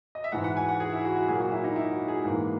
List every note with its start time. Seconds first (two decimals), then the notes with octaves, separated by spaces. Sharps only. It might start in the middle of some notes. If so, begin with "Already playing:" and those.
0.15 D#5
0.24 E5
0.32 G#2 E3 G#3 F#5
0.44 F#5
0.57 G#5
0.69 F#5
0.80 G#4
0.92 E4
1.05 F#4
1.16 F#4
1.28 A#2 F#3 A#3 G#4
1.40 F#4
1.52 E4
1.64 D#4
1.76 E4
1.92 F#4
2.08 G#4
2.24 G#2 E3 A#3